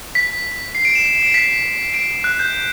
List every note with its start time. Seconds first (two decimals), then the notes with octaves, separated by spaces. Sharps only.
0.15 B6
0.75 C7
0.85 D7
0.95 E7
1.15 E7
1.24 D7
1.34 B6
1.94 D7
2.24 F#6
2.39 G6